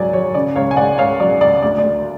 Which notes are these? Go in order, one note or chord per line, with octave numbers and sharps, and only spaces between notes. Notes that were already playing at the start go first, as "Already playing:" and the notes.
Already playing: C#2 F#3 D5 G#5
F#3 C#5
C#3 D5
C#2 C#5 F5
G#5
C#2 D5 F#5
C#2 C#5 F5
F#3 D5
C#2 D5
D2 D5
D5
D2